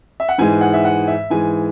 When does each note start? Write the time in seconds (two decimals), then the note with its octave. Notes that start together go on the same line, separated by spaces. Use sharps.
0.20 E5
0.29 F#5
0.38 G#2 E3 G#3 G#5
0.61 F#5
0.73 E5
0.85 F#5
1.08 E5
1.30 G#2 E3 G#3 G#5